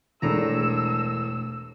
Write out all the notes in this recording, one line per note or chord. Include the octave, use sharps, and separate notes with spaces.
E1 A2 D4 G#4 A#5 E6